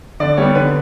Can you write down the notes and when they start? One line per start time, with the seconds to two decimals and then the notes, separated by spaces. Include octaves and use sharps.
0.20 D3 D5
0.37 G3 B3 C#5
0.55 D3 B4